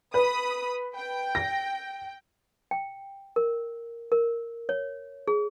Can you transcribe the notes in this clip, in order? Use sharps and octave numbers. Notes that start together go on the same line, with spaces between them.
B4 B5 D#6
G5
A#6
G5
A#4
A#4
C#5
G#4